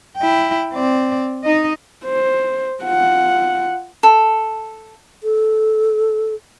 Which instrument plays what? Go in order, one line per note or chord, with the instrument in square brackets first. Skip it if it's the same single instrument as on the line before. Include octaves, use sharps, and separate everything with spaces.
[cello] E4 G5
C4 D5
D#4 D#5
[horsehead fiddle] C5
F4 F#5
[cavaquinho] A4
[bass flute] A4